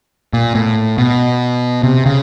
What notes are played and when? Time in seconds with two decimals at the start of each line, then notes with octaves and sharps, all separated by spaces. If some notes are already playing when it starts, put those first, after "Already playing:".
0.33 A#2
0.55 A2
0.98 B2
1.83 C3
2.06 C#3